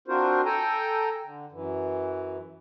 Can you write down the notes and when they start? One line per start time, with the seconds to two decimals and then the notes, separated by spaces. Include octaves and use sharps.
0.08 C4 D4 F4 F#4 A#4 C5
0.45 A4 G5 G#5 A#5
1.24 D3
1.52 F#2 E3